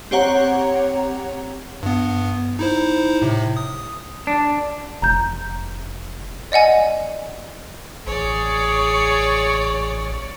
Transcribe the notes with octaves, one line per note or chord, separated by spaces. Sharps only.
C4 G4 C#5 F#5 A#5
G2 B3
D#4 E4 C5
A2 C3
D#6
D4
F1 A#5 G6
D5 D#5 F#5 G#5
A1 G#4 C#5 D5